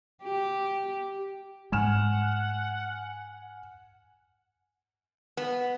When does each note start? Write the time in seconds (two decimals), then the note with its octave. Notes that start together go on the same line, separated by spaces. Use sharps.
0.23 G4
1.72 G#2 G#3 F#5 G#5 F6 E7
5.37 B3